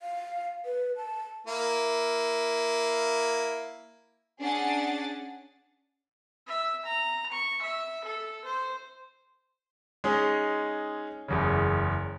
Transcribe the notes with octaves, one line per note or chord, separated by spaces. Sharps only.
F5
B4
A5
A#3 E4
C#4 D4 G#4 F#5 A6
E5
A#5
C#6
E5
A4
C5
G#3 C#4 D#4 G#4
F#1 E2 C#3